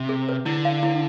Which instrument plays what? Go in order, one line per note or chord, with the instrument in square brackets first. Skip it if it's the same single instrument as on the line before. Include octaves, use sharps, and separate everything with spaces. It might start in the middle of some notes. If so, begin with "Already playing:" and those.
Already playing: [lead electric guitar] C3
[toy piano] G#4
B4
[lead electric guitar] D3 [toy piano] E4
[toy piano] F5
E4